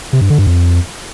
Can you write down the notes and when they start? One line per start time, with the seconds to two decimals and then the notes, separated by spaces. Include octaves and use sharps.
0.13 C3
0.21 G2
0.30 D3
0.38 G2
0.47 F2